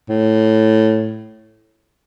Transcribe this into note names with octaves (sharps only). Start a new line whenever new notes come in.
A2